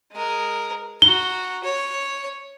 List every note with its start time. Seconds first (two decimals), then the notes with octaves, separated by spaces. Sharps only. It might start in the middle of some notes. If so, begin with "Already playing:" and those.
0.13 G#3 A#4
1.02 F#4 A#5 G7
1.64 C#5